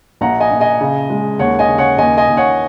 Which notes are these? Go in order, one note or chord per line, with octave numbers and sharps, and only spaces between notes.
A#1 F#5 A#5
D#5 G#5
A#1
D#5 G#5
C#3
G#3
D#2 C#5 F#5
D#5 G#5
C#3
C#5 F#5
D#2 D#5 G#5
D#5 G#5
D#2
C#5 F#5